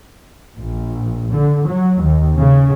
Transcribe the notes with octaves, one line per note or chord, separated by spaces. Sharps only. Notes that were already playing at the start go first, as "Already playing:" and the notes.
A#1
D3
F#3
D#2
C#3